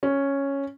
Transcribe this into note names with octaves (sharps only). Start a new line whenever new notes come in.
C#4